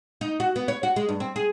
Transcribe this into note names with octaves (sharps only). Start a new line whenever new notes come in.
D#4
F#4
B3
C#5
F#4
G#3
G2
C4
G#4